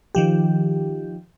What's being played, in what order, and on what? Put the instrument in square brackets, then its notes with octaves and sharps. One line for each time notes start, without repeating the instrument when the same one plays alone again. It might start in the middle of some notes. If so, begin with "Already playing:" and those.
[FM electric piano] D#3 F3 G4